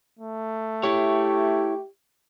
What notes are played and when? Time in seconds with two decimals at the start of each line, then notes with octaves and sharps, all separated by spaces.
0.19 A3
0.83 E4 G4 C#5